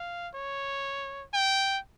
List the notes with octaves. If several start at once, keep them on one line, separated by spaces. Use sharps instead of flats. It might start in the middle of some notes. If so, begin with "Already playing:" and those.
Already playing: F5
C#5
G5